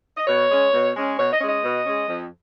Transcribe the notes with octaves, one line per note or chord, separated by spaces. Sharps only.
D#5
B2 C#5
G#3 C#4
B2
G#3 C#4
B2 C#5
D#5
G#3 C#4
D#5
B2
G#3 C#4
F2